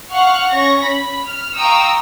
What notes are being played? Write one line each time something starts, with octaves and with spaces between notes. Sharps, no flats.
F5 F#5 C#6 F6 F#6
C#4 C#6 A#6
B5
F6
F5 G5 A#5 C#6 D#6 E6